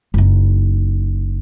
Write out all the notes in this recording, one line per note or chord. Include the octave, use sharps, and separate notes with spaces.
F#1 D#4